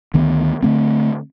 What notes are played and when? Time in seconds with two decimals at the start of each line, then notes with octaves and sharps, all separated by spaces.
0.14 D2 D#3 B3
0.63 D3 A3 C4